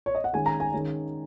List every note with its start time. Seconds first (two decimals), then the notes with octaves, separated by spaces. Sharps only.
0.06 C#5
0.15 D#5
0.24 F#5
0.33 D#3 G#3 C#4 G#5
0.46 A#5
0.60 G#5
0.73 D#3 G#3 C#4